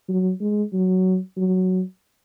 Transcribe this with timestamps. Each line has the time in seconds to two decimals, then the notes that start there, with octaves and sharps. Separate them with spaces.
0.09 F#3
0.41 G#3
0.73 F#3
1.37 F#3